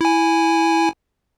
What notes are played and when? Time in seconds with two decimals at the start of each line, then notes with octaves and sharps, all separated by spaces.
0.01 E4 G#5